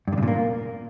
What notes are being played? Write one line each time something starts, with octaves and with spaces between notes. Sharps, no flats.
G2
D3
C#3
A#2
A#3